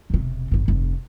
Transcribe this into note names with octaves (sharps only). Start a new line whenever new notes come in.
E1 C3
G#1 G2
F1 G2